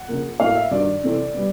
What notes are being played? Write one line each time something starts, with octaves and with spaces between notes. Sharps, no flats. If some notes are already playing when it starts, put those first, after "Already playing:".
Already playing: F#5
C#3 F3 A#3
A2 F#3 A#3 F5
E5
G2 D#3 F#3 D5
C3 E3 A3 C4
G3 B3